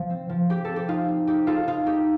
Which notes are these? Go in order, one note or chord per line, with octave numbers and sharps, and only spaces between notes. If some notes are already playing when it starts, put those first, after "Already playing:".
Already playing: F3
C4
F3
C4 G4
C4 A4
G4
D#4 F4
C4
D#4 G4
D#4 F4 A4
D#4 F4
D#4 G4